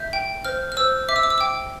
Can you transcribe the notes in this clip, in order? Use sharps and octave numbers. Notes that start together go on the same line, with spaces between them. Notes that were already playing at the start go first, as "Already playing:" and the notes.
Already playing: E5 G6
G5
C5 F6
F6
C5 E6
E5 D6
E6
D6
E6
G5 D6